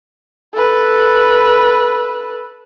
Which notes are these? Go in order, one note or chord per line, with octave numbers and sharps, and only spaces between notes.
A4 B4